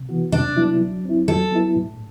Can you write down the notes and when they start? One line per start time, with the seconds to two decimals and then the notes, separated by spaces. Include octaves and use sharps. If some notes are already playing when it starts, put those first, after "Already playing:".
Already playing: C3
0.09 E3 B3 F#4
0.32 C3 D4
0.56 F#3 B3 E4
0.80 F#3
1.04 C4 E4
1.28 F#3 A4
1.52 B3 E4
1.76 A2